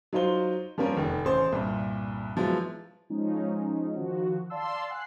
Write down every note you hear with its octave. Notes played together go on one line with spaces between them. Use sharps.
F#3 D#4 F4 C5 G7
F3 G3 A#3 C4 C#4 A#4
F1 D#3
A1 C#3 C5
C2 G2 A#2
F3 F#3 G#3 B3 E4
F3 G#3 C#4 D#4
D#3 F3 F#4
D5 F5 A5 C6 E6
F#5 G#5 F#6 C7